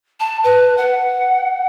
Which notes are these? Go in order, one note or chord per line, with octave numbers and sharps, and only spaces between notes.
A5
B4
F#5